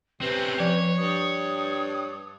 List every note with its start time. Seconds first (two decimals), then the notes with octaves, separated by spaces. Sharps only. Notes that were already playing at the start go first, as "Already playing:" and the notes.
0.21 C3 C4 C#4 B4
0.60 F3 C#5
0.97 G2 D#6